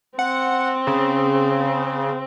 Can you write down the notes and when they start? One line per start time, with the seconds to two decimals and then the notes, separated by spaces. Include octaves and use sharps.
0.19 C4 F#5
0.87 C#3